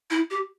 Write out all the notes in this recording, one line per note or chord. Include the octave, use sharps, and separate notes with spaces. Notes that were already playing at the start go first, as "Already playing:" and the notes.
E4
G4